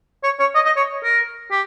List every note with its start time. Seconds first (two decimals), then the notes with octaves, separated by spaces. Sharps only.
0.24 C#5
0.40 C#5
0.55 D#5
0.66 D#5
0.77 C#5
1.04 A#4
1.51 G4